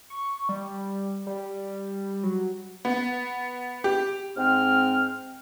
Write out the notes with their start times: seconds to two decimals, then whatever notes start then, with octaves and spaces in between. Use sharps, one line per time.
0.10 C#6
0.49 G3
1.27 G3
2.23 F#3
2.85 B3
3.84 G4
4.37 G#2 C4 F6